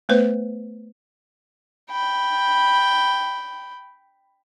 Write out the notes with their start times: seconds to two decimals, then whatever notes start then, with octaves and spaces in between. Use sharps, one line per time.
0.09 A3 B3 B4 C5
1.91 G5 B5